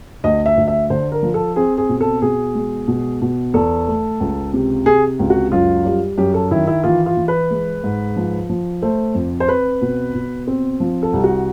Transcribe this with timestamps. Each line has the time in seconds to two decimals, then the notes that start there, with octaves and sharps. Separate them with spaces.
0.24 D2 D#5
0.46 E5
0.57 D2
0.68 E5
0.90 D3 C5
1.12 A#4
1.22 F3
1.34 A4
1.56 C4 G#4
1.78 G#4
1.89 B2
2.01 A4
2.22 B2 G#4
2.55 G#3
2.88 B2
3.21 B2
3.54 E2 A4
3.88 A3
4.20 C#2
4.54 C3
4.86 C3 G#4
5.19 C#2
5.30 F#4
5.52 F#2 F4
5.85 G3
6.18 F#2 G4
6.34 A4
6.51 D#3 E4
6.67 E4
6.84 E3 F4
7.06 F4
7.17 E3
7.28 B4
7.51 G#3
7.84 G#2
8.16 F3
8.49 F3
8.82 A3 C5
9.15 F2
9.40 C5
9.48 C4 B4
9.81 B2
10.14 B2
10.47 C4
10.80 F3
11.03 A4
11.13 C2
11.24 F#4